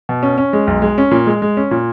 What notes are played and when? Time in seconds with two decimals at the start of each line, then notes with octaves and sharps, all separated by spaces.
0.09 B2
0.23 C#4
0.38 C#4
0.53 G#3
0.67 B1
0.82 G#3
0.98 C#4
1.11 A#2
1.26 G#3
1.42 G#3
1.57 C#4
1.71 A#2